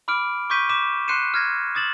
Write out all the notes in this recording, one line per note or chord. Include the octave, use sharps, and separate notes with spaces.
B5 D6 F6 D7
C#6 D6 G6 B6 D#7 G7
D6 B6 E7
C6 F#6 C7 C#7 D#7 E7
F6 G#6 A#6
D6 D#6 A6 E7 F#7